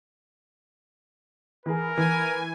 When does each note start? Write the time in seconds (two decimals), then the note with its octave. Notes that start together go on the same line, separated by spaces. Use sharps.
1.66 E3 G#4 A#4
1.97 E3 G#5